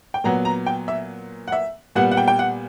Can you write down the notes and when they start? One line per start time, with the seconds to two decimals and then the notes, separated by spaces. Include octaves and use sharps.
0.14 G5
0.24 A#2 F#3 B3 A#5
0.45 A#5
0.66 G5
0.88 E5
1.48 F#5
1.52 E5
1.95 A#2 G3 B3 F#5
2.11 F#5
2.17 G5
2.28 G5
2.39 F#5